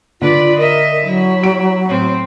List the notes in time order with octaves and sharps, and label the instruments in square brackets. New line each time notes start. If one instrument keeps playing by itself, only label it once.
[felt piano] D3 [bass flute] F4 [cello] B4 D5
[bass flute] A#4 [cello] D#5 E5
[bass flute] F#3 [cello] E4
[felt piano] D7
[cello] A2 C4